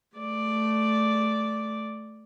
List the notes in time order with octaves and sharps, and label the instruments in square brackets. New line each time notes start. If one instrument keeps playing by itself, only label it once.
[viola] A3 D5